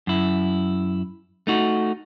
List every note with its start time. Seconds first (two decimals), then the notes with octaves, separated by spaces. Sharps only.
0.07 F#2 E4
1.47 A3 D#4 F#4